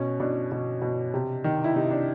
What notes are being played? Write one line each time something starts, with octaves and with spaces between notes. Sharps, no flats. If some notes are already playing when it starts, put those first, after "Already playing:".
Already playing: B2 C#4
B2 D4
B2
B2
C3
D#3
E4
C3 D#4
D4